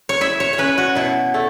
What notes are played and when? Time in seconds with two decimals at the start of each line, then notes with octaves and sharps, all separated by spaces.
0.09 C#5
0.21 E4 E5
0.40 C#5
0.53 C#5
0.58 C#4 B4
0.78 F#4
0.95 B2 E4
1.34 A3